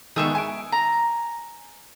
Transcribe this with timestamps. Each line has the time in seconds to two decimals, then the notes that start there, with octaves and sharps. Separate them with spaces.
0.16 D#3 G#3 B3 G#4 E5 C#6
0.35 G#5 D7
0.72 A#5